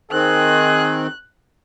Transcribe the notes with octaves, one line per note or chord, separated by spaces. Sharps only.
D#3 C4 G#4 F#6